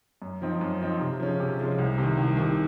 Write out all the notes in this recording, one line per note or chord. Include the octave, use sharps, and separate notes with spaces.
F#2
F3 C4 D#4
F#2
F3 C4 D#4
C3
F3 G#3 C#4
C3
F3 G#3 C#4
C2
C3 D#3
C2
C3 D#3